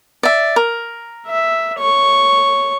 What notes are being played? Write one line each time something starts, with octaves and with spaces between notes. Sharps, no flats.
D5 E5
A#4
E5
C#5 C#6